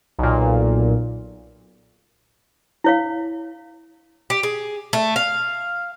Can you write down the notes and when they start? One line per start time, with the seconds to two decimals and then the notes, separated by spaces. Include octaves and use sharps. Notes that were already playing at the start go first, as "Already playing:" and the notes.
0.18 B1 A#2
2.84 E4 C#5 F5
4.30 G4
4.43 G#4
4.93 A3
5.16 F5